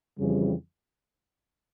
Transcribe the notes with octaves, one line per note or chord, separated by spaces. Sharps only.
F2 C#3 E3 G3